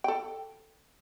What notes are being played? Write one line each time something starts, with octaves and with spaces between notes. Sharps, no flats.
A4 G5